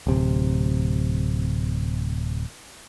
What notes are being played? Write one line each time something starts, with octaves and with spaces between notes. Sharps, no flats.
D1 C3